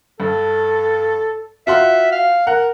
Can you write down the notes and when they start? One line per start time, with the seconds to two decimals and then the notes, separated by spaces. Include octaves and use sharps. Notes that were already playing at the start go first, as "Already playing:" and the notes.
0.20 G2 A4
1.67 F4 F#4 E5 C6
2.12 F5
2.47 A#4 F#5